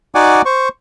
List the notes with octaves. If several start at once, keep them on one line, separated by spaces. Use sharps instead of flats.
D#4 F#4 D5 F#5 G#5 D6
C5 C#6